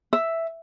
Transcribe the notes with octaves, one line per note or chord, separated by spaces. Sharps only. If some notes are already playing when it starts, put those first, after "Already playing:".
E5